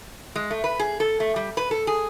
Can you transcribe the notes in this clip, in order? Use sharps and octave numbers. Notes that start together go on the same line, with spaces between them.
G#3
A3
B4
G#4
A4
A3
G3
B4
A4
G#4